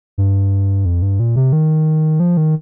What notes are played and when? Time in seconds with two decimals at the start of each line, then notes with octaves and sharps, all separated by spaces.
0.18 G2
0.85 F2
1.02 G2
1.20 A#2
1.36 C3
1.53 D#3
2.20 F3
2.37 D#3